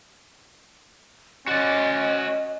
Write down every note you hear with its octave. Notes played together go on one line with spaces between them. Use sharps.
C#4 F#4 D5 D#5